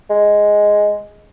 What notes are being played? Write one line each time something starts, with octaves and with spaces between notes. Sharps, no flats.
G#3